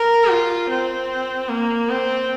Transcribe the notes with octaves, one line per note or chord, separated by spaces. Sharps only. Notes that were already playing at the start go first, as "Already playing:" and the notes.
Already playing: A#4
F4
C4
A#3
C4